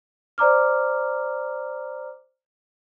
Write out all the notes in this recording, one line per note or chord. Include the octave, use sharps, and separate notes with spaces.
C5 D5 A#5 D6 F6